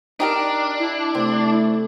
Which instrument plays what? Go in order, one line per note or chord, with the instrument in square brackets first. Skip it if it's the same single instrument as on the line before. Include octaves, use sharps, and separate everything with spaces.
[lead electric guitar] D4 [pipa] D#4 G4 A#4
[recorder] E4
[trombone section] C3 A3 [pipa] C4